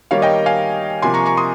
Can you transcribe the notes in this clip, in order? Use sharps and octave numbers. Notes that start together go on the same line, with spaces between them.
D#3 G3 A#3 C#5 F5
D#5 G5
F5 G#5
C3 F3 A#3 G#5 C6
A#5 C#6
A#5 C#6
C6 D#6